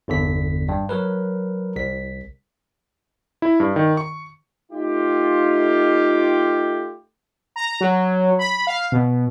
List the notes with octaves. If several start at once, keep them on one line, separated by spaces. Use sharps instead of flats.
G1 E2 D3 B6
G2
F#3 A#4 B4
C2 B6
E4
G2
D#3
C#6
A3 D#4 F4 G4
A#5
F#3
B5
F5
B2